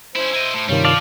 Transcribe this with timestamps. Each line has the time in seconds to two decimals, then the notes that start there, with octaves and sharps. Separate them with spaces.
0.16 C#4 E4 C5
0.33 E4 D#5
0.54 A2
0.69 G2 C3 D#3 G3 D4 F4 C#5
0.85 F3 D5 F5